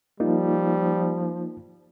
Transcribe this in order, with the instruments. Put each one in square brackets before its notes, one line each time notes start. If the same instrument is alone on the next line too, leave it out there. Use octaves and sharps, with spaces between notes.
[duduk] F3 [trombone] G3 [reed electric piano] A#3 D#4 F4